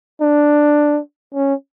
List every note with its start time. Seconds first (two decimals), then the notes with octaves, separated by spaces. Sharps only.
0.21 D4
1.34 C#4